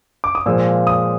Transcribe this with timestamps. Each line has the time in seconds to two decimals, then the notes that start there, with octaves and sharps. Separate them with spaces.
0.24 D6
0.35 D#6
0.46 A#2 F3 G#3 E6
0.87 D#6